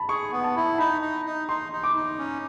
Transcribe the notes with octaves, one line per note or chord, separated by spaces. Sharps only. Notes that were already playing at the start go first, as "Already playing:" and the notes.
Already playing: A5 B5
G#4 C#6
B3
A5
E4
D#4 B5
D#4
D#4
D#4 C6
D#4
D6
D#4
C#4